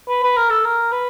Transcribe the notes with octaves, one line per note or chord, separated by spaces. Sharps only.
B4
B4
A#4
A4
A#4
B4